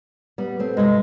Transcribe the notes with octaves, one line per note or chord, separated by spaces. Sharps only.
G3 B3
A3 C4
G2 C3 G#3